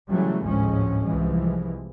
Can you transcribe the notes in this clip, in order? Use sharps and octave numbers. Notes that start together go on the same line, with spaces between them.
C#3 E3 F#3 G3 A3
G#1 D2 A2 F3 G#3 C#4
C2 E3 F3 G#3